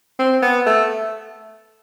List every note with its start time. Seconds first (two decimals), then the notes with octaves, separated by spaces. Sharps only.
0.19 C4
0.42 B3
0.66 A3